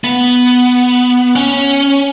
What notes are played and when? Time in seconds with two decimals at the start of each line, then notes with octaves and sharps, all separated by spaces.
0.04 B3
1.35 C#4